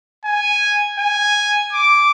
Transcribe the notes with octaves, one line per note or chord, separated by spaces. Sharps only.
G#5
G#5
D6